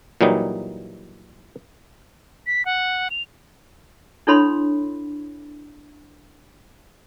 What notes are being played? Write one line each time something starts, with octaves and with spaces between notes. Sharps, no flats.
A#2 E3 F#3 G3 D#4
B6
F#5
F7
D4 E4 A4 C#5 B5 C6